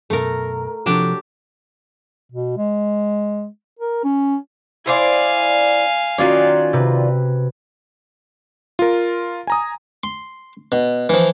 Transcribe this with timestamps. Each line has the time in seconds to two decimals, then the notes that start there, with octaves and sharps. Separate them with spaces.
0.10 F#2 B2 A3 A#4
0.86 C3 F3 F#3 D4 G4 A4
2.32 B2
2.57 G#3
3.79 A#4
4.04 C#4
4.86 E4 C5 D5 F5 G#5
6.18 D#3 C#4 F4 F#4 D5
6.73 C3 B4
8.79 F4 A#4
9.47 G#5 A#5 D#6
10.03 C6
10.72 B2
11.09 E3 F3